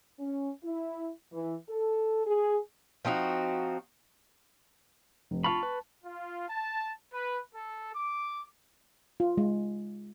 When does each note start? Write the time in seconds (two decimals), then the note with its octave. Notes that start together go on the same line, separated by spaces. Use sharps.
0.20 C#4
0.63 E4
1.33 E3
1.69 A4
2.26 G#4
3.05 F3 C4 D#4 F#4
5.31 F1
5.44 F4 F5 A5 B5 C#6
5.63 B4
6.04 F4
6.49 A5
7.12 B4
7.54 A4
7.95 D6
9.20 F4
9.37 G#3